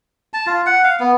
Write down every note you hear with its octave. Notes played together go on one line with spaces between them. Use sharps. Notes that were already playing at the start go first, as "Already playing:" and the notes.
A5
F4
F#5
F5
B3